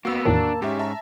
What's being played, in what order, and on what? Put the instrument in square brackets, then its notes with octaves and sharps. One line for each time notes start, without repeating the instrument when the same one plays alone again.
[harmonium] D#2 [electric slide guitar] A#3 B3 [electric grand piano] F#4 E6
[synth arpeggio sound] E2 A2 D#3 [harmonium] A#3 A5 [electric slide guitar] D4
[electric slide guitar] G#2 [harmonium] C#4 [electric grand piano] G4 E5
[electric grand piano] E5 A5 A#5